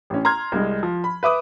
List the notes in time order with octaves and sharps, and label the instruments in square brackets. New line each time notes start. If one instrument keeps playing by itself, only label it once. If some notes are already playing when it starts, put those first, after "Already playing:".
[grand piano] A1 C#4
A#5 C6 F6 G#6
C2 G#3
F3
B5
B4 E5 D6 D#6